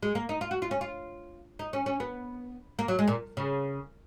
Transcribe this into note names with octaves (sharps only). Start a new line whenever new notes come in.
G#3
A#3
D#4
F4
F#4
F4
C#4
F4
D#4
C#4
C#4
B3
A#3
F#3
G#3
A#2
C#3